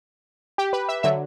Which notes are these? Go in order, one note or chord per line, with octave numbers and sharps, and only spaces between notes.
G4
B4
E5
D3 F#3 E5